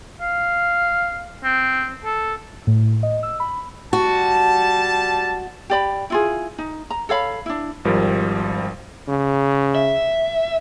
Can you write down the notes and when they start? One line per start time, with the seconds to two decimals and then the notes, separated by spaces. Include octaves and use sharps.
0.21 F5
1.44 C4
2.05 A4
2.67 A2
3.03 D#5
3.23 E6
3.40 B5
3.93 G3 F#4 A5
5.70 G4 D5 B5
6.10 E4 F4 G#4
6.58 D#4
6.90 A#5
7.09 A4 C#5 F5 B5
7.46 D4 E4
7.85 G#1 F3 G3 A#4
9.08 C#3
9.75 E5